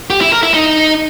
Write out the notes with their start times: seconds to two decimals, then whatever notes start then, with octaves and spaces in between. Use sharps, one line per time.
0.10 G4
0.21 E4
0.32 A#4
0.43 E4
0.54 D#4